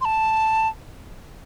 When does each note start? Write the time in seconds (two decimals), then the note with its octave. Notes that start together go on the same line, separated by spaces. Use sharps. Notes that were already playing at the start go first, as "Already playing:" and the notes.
0.01 C6
0.05 A5